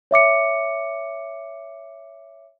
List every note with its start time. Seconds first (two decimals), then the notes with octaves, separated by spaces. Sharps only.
0.11 C#5 E5 D6 C#7